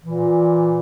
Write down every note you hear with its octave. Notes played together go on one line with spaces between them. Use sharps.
A#2 E3